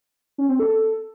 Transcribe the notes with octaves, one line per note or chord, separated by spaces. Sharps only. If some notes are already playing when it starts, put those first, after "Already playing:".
C#4
C4
A4